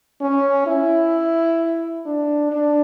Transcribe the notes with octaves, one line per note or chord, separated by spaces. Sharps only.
C#4
E4
D4
D4